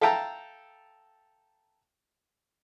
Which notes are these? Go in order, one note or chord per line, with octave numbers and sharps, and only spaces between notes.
A4 E5 F5 G5 A5 A#5